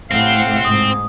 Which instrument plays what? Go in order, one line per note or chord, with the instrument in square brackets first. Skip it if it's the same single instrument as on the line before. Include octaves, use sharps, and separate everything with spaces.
[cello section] A2 C3 [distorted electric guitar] C4 [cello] F5 F#5
[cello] G#2 [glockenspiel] D#6